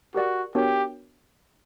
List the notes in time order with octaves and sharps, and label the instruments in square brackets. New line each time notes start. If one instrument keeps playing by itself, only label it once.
[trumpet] F#4 [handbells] G4 A#4 D5 F#5
[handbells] B3 D4 F#4 A#4 C#5 [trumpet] G4